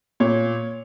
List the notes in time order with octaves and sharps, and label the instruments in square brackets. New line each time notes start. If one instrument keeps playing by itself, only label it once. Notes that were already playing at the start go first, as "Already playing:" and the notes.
[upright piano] A#2 C#5